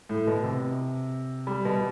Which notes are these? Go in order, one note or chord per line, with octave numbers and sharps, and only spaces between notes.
A2
B2
C3
G3
B2